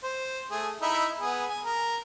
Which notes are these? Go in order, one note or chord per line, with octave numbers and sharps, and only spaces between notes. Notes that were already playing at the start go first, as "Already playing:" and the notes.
C5
A3 G#4
D#4 E4 E5
B3 G#4
G#5
A#4